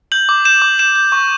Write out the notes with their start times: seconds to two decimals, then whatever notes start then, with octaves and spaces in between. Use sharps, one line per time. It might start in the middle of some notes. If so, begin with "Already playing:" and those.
0.12 G6 F#7
0.29 D6
0.45 G6 E7
0.62 D6
0.79 G6 E7
0.95 G6
1.12 C#6